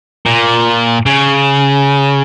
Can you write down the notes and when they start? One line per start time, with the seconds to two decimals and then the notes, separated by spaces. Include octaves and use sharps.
0.26 A#2
1.06 C#3